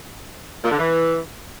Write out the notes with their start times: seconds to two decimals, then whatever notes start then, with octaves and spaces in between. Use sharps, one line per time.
0.64 A#2
0.71 D3
0.78 E3